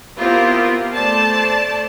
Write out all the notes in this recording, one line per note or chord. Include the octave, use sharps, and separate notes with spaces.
B3 C4 E4 F4 G4 A#4
A3 C5 D5 A5